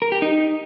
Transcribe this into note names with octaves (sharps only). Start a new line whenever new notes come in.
A#4
G4
D#4